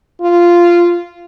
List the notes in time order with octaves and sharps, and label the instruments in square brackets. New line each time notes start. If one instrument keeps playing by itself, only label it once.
[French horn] F4